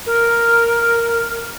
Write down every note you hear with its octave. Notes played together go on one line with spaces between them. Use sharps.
A#4